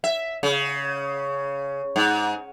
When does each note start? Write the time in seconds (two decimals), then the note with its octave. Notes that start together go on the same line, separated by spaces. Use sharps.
0.04 E5
0.43 C#3
1.96 G#2